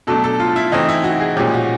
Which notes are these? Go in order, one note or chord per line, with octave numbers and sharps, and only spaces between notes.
B2 F#3 A3 D4 A4
A4
F4
E4
E3 A3 C4 D#4
E4
F#4
G#4
A#2 F3 G#3 C#4 G4
F#4